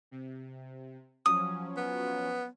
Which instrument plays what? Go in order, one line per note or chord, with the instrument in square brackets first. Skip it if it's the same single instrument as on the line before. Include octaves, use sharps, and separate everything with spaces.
[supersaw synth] C3
[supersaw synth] F3 F#3 C#4 [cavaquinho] D#6
[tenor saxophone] B3